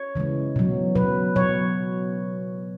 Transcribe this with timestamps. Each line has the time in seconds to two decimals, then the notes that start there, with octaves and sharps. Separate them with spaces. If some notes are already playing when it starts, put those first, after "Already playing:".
Already playing: C#5
0.15 C#3 E3 G#3
0.56 B2 F#3
0.95 B2 F#3 B4
1.36 B2 F#3 C#5